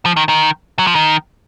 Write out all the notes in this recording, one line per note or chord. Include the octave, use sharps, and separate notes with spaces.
F3
D#3
D#3
F#3
F3
D#3